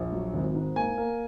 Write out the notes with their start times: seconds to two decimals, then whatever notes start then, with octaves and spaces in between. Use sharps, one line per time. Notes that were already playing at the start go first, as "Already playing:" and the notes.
Already playing: A#1
0.13 F#3
0.33 G#1
0.55 G#2
0.76 A#3 G#5
0.98 A#3